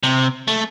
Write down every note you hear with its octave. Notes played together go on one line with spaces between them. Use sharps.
C3
A3